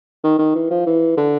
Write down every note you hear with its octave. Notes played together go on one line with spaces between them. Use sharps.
D#3
D#3
E3
F3
E3
D3